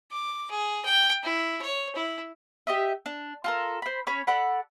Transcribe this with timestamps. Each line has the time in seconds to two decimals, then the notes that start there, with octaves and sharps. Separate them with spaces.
0.11 D6
0.51 G#4
0.85 G5
1.23 E4
1.61 C#5
1.95 E4
2.67 G4 D#5 E5
3.06 D4
3.44 F4 A4 A#4
3.82 C5 B5
4.07 C#4 C#5 B5
4.27 A4 D5 F#5 B5